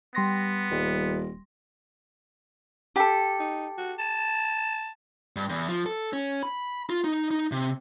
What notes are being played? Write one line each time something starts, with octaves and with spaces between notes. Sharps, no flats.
G3 B3 C6 A#6
D#1
G4 A4
D#4
F#4
A5
G2
E2
F3
A4
C#4
B5
F4
D#4
D#4
C3